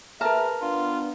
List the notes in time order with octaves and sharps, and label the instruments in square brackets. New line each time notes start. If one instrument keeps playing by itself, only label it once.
[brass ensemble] G#4 B4 E5 [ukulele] A#4 A5 [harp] A#5 F6
[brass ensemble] B3 D4 [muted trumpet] F4